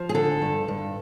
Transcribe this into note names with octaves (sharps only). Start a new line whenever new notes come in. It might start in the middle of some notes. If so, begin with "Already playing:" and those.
Already playing: F3
G#4
D3 A4
G2
G2